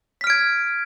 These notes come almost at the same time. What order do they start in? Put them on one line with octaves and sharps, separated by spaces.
B6 F6 D7 G#6